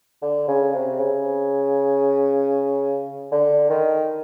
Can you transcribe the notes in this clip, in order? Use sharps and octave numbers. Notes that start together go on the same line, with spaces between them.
D3
C#3
C3
C#3
D3
D#3